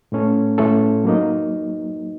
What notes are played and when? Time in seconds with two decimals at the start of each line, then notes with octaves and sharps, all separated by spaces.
0.12 A2 A3 C#4 A4
0.58 A2 A3 C#4 A4
1.04 F#3 A#3 D#4